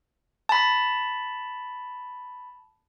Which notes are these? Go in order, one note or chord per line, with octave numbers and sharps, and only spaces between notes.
A5 B5